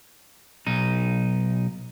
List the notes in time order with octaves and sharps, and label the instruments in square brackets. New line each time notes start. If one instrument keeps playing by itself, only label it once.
[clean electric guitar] B1 D#4